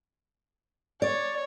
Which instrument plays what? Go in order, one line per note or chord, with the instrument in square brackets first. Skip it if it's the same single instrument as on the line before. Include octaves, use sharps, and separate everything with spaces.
[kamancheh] C#5 [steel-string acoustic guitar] D5